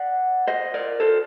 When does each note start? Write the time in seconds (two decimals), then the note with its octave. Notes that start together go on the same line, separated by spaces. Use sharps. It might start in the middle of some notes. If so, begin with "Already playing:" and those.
Already playing: D5 F#5
0.48 C5 D#5
0.74 A#4 D5
1.00 A4 C5